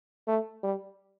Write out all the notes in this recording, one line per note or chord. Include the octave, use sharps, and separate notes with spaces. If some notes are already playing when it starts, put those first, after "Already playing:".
A3
G3